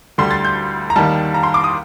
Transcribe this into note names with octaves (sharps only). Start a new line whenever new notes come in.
D2 D3 G3 C6
A6
G6
A#5
D#2 D#3 G3 A5
A#5
C6
D6
D#6